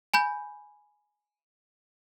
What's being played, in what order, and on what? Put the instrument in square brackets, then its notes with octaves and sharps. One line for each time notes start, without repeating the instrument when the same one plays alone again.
[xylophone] G#5 B5 G6